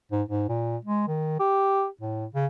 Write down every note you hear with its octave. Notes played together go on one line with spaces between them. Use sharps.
G#2
G#2
A#2
G#3
D#3
G4
A2
C#3